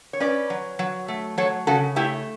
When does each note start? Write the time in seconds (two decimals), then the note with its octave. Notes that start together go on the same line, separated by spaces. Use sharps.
0.13 C#5
0.20 C#4 B4 D5
0.50 F#3
0.79 F#3
1.08 A3
1.38 F#3 A4 C#5
1.67 C#3 F#4 A4
1.96 A3 E4 G4